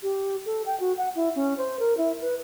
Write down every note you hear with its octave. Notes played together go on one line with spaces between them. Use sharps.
G4
A4
G5
F#4
F#5
E4
C#4
C5
A#4
E4
B4